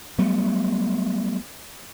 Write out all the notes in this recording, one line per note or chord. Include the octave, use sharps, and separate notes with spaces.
F#3 G3 A3 B3